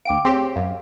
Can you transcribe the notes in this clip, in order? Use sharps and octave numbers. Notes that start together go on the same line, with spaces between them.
D2 F5 G5 D6 D7
C4 G4 G#4 C#5
F#2 F5